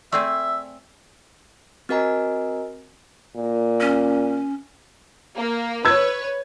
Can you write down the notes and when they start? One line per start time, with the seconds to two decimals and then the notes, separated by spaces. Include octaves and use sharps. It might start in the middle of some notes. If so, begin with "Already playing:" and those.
0.12 A3 C4 G#4 D5 E5 E6
1.89 C4 F#4 A#4 D#5 G#5 A#5
3.37 A#2
3.81 C#4
5.36 A#3
5.85 B4 C#5 E6 G#6